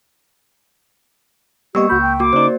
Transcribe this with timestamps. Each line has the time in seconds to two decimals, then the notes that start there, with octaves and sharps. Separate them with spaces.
1.75 G3 A#3 B3 G4 D#5 C#6 E6
1.90 C#2 F#4 B5 G6
2.01 G5
2.20 A#3 F#4 D6
2.33 C#3 D#4 C5 D5